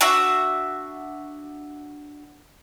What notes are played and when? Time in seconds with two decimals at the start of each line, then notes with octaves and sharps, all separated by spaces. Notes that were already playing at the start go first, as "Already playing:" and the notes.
0.01 D4 F#4 E5